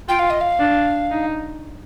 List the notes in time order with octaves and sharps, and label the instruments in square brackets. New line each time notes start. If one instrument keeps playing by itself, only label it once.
[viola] F4 [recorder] G5
[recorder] F5
D#5
F5
[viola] D4
D#4